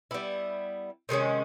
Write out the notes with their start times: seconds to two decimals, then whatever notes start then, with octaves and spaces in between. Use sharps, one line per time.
0.11 G3 B3 E4
1.09 C3 D#3 G#3 C#4